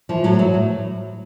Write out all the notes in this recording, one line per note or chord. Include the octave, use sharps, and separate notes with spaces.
E3 F3
A2 F#3
E3 F#3
A2